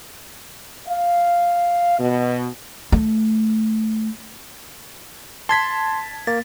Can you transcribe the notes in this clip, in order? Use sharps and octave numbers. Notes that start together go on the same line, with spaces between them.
F5
B2
A3
A5 C6 G#6 B6
A#3 A6